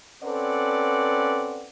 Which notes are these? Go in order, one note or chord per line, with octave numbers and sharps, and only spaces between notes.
C4 C#4 A4 B4 D5 F#5